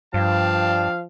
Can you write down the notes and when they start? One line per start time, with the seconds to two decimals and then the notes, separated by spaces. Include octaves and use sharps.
0.14 G2 F3 D4 F5 G5 A5